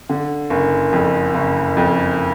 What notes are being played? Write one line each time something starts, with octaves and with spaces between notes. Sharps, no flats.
D3
F#1
F2
F#1
F2